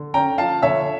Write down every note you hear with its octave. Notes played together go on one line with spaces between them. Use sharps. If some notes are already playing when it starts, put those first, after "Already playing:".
Already playing: D3
C#4 G5 A#5
F3 F5 A5
D3 C#5 E5